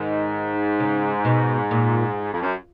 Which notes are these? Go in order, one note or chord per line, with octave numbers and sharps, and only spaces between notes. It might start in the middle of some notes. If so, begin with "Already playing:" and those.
Already playing: G#2 D#3
C#3
B2
A#2
F2
F#2